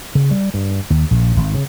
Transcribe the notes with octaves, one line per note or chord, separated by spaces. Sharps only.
C#3
G3
G2
D#2
A#1
G#1
C#3